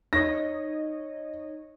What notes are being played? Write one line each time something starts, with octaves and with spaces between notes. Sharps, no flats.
D#4 C#5 D#5 A#6